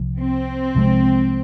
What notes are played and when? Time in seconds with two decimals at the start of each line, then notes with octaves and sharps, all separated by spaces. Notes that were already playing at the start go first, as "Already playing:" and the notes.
Already playing: C2 C3 F3
0.20 C4
0.75 C2 C3 F3 G#3